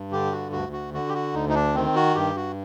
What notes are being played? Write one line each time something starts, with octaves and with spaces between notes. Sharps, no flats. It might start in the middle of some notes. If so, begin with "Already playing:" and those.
Already playing: G2
D3 G4
F#4
D2 F#4
F#4
D3 F#4
G4
F#4
D2 D#4
D#4
D4
D#3 C4
F#4
G2 G4
F#4